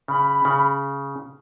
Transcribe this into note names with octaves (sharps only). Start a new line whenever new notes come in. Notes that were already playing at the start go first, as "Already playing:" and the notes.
C#3 B5
C#3